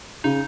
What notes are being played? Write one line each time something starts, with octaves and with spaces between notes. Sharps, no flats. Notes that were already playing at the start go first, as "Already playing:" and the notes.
C#3 D#4